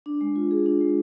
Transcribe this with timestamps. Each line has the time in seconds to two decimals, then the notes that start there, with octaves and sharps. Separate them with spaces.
0.06 D4
0.21 G#3
0.36 F4
0.51 G#4
0.66 D4
0.81 G#3